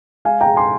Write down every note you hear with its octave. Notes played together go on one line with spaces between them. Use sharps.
G#3 F5 G#5
G5 A#5
G#3
G#5 C6